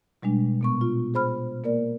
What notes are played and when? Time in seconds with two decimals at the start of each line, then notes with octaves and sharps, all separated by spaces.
0.22 B2 G3 G#3 D4
0.61 A#2 B3 C#6
0.81 F4
1.14 G#4 C5 B5 F6
1.64 A#3 A#4 D5